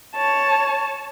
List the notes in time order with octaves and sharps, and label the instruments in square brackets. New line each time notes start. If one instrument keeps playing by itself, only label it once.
[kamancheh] C#5 A5